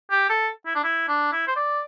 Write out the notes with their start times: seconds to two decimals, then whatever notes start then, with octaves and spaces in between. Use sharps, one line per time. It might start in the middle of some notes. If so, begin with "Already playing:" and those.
0.11 G4
0.30 A4
0.66 E4
0.75 D4
0.84 E4
1.08 D4
1.33 E4
1.48 C5
1.56 D5